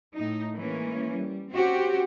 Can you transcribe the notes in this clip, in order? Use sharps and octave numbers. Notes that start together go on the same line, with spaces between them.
A2 D#4
E3 G#3 A#3 C#4
G3
C4 C#4 F#4 G4